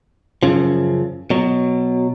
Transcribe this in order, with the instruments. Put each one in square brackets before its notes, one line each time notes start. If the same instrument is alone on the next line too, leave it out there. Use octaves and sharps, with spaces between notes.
[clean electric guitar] F#2 C#3 F3
B2 F#3